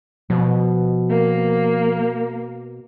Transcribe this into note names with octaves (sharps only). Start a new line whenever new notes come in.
B2 F3
A#3